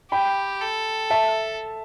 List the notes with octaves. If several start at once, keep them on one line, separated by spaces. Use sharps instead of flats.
G4 G5 B5
A4
E5 A5